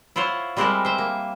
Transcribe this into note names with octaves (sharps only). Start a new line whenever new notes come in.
E4 F4 C5 C#5 F#5
G3 G#3 C4 E4 A4 A#4
C5 E5
A#3